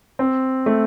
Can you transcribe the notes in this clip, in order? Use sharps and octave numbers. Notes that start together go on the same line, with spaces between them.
C4
A3